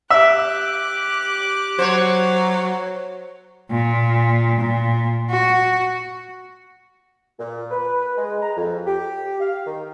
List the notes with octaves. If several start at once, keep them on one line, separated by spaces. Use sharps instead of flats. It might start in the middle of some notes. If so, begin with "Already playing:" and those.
G4 E5 D6 F#6
F#3 C5 C#5
A#2
A#2
F#4
A#2
B4
G#3
A#5
F2
G4
F5
D#3